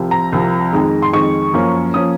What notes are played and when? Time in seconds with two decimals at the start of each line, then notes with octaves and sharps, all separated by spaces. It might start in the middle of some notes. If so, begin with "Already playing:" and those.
Already playing: C2 C3 F3
0.11 A#5
0.32 C2 C3 F3
0.73 F2 D#3 G#3
1.02 C6
1.13 F2 D#3 G#3 C#6
1.53 F#2 F3 A#3 C#4
1.94 F3 A#3 C#4 D#6